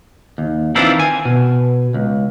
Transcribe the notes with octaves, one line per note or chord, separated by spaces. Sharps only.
D#2
D#3 E3 C4 D4 E4 F4
G#5
B2
C#2